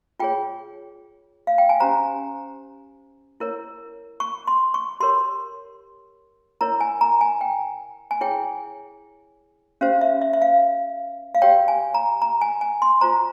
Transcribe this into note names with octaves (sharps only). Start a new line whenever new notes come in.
F4 G#4 C#5 G5
F5
G5
G#5
C#4 G4 C5 A#5
E4 A#4 C#5
C#6
C6
C#6
G4 A#4 C#5 C6
E4 A#4 C#5 A#5
G#5
A#5
G#5
G5
G#5
E4 G#4 C#5 G5
C#4 G4 C5 F5
E5
E5
E5
F5
F5
G4 C#5 G5
G#5
A#5
A#5
G#5
G#5
C6
F4 C5 A#5